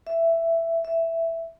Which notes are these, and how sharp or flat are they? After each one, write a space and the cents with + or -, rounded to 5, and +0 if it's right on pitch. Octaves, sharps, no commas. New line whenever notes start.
E5 +10
E5 +5